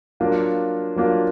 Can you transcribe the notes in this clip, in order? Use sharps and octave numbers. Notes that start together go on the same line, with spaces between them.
F#3 A#3 D4 F4
F#3 A#3 D4 F4